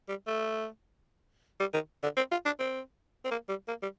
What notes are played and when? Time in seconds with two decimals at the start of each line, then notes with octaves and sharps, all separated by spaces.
0.08 G3
0.27 A3
1.60 G3
1.74 D#3
2.03 D3
2.17 C4
2.32 F4
2.45 D4
2.59 C4
3.25 C4
3.31 A#3
3.49 G3
3.68 A#3
3.82 G3